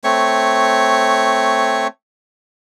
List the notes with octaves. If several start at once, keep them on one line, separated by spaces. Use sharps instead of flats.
A3 C4 C#5 C#6